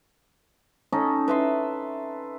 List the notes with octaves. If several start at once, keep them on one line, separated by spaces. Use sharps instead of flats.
C#4 D#4 A4
B4 E5 C6